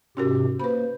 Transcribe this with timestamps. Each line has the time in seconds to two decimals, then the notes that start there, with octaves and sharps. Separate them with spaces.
0.17 G#2 C3 C#4 F#4 G4 A#4
0.60 A#3 B4 C5 B5